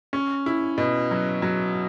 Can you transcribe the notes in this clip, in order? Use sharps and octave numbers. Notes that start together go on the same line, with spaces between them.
C#4
E4
B2
F#3
F#3